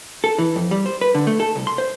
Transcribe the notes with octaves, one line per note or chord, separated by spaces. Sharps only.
A4
E3
F2
G3
C5
B4
D3
A3
A4
C2
C6
C5